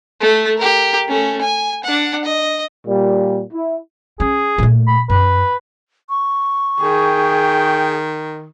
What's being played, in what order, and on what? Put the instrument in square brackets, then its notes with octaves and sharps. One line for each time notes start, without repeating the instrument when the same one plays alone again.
[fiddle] A3 A4
G4 A#4
A3 C#4
G#5
D4 F#5
D#5
[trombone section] A#2 G3
E4
[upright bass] C#4 [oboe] G#4
[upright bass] A#2 A3
[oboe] B5
[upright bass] F#2 [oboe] B4
[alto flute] C#6
[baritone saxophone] D#3 [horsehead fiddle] G#4 [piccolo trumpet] G5